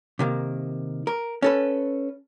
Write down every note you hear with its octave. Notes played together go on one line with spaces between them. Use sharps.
C3 D#3 A#3
A#4
C#4 A4 B4